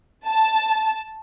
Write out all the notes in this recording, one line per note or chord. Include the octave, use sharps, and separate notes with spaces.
A5